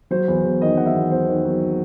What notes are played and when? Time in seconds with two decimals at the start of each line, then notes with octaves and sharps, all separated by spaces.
0.11 F#3 C5
0.28 E2
0.44 E2
0.61 D#3 D#5
0.77 F#3 F#5
0.86 E5
0.94 E2
1.11 E2 C5
1.28 D#3
1.45 F#3